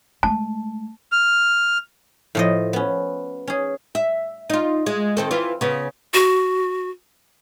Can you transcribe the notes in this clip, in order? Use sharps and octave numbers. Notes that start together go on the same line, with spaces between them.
G#3 A3 A5
F6
A2 F3 D#5
B3 C#4
C#4 G#4
E5
D#4 F4
G#3
D#3 C4 A4
E3 F4
C#3 B3
F#4